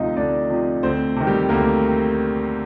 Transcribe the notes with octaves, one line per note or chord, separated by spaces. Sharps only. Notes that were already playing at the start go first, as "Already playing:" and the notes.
Already playing: D2 C3 F3 D#4 F4 D#5 F5
D2 D4 D5
C3 F3
D2 C4 C5
C3 D#3
G3 G4
D2 A#3 A#4